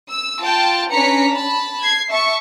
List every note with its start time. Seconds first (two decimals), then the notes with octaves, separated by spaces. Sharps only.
0.10 E6
0.44 F4 G5 A5
0.91 C#4 D4 B4 A#5 B6 C#7
1.32 A5 B5
1.81 G#6 C7
2.09 E5 A5 C#6